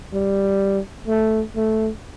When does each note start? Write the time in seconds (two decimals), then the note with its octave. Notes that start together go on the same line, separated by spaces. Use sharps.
0.13 G3
1.08 A3
1.56 A3